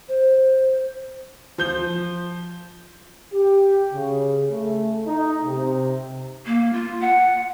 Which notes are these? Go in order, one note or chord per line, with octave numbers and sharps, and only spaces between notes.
C5
F3 G6 G7
G4
C#3
A3
D#4
C3
A#3
F4
F#5